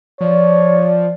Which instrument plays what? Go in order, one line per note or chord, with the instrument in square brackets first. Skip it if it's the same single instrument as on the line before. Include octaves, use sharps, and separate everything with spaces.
[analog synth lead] F3 [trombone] C#5 [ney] D5